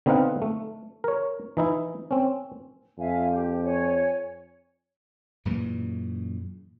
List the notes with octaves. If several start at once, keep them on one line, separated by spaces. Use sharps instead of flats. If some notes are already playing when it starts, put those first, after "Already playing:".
D3 B3 C4 D#4 F5 F#5
A3
A#4 C#5
E3 D#4 E4
C4 C#4
F2 E5 F5 G#5
G4
C#5 G#5
F#2 A#2 C#3 E3